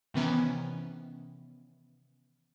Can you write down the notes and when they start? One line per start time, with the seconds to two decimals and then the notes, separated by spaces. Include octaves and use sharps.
0.14 C3 D#3 E3 B3 C#4